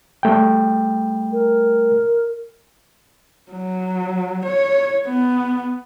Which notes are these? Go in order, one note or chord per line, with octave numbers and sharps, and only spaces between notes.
G3 A3 G5
A#4
F#3
C#5
B3